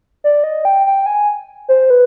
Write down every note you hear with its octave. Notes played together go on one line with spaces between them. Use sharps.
D5
D#5
G5
G5
G#5
C5
B4